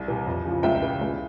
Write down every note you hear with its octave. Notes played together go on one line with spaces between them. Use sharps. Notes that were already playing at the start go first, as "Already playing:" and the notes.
Already playing: C2
C3 E3
F2
C#3 F3
C#2 E5 G5
C#3 E3
C#2